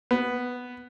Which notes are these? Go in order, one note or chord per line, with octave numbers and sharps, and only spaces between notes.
B3